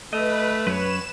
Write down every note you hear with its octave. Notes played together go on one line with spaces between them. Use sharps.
A3 B4 D#5
F#2 B4 C#5 E7